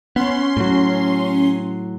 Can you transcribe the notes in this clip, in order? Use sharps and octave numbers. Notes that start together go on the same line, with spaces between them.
B3 C#4 C6
A2 F#3